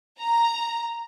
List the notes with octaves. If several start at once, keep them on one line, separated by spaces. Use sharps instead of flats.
A#5